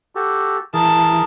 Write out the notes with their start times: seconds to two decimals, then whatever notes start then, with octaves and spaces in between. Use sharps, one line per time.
0.15 F#4 G4 A4
0.74 E3 G#4 A#4 A5